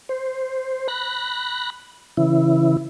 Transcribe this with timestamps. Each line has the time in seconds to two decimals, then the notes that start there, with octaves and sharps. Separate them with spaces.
0.09 C5
0.88 B5 F#6 A#6
2.17 C#3 E3 E4